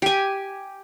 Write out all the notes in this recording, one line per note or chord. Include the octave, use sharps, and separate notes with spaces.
G4 G#5